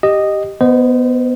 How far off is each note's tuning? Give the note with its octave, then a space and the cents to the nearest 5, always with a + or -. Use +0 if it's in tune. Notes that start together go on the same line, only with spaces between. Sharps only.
G4 +0 D#5 -10
B3 +0 C5 -30 D#5 -15